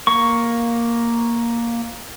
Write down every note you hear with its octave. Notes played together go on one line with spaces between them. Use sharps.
A#3 C#6